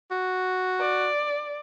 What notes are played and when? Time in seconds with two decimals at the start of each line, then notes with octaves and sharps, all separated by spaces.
0.11 F#4
0.81 D5